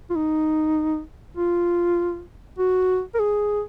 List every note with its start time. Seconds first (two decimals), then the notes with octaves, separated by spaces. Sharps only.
0.10 F4
0.16 D#4
1.37 F4
2.58 F#4
3.14 A#4
3.19 G#4